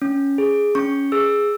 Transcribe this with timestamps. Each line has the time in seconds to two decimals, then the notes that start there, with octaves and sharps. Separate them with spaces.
0.02 C#4
0.38 G#4
0.75 C#4 C#6
1.12 G#4 E6